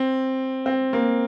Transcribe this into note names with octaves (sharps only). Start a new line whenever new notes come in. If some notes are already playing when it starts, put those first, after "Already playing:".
Already playing: C4
C4
A#3